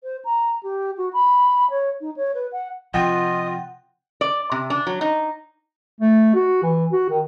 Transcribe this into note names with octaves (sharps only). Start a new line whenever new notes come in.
C5
A#5
G4
F#4
B5
C#5
D#4
C#5
B4
F#5
C3 F3 F4 D#5 F#5 G5
D5
C3
D4
F#3
D#4
A3
F#4
E3
F#4
D#3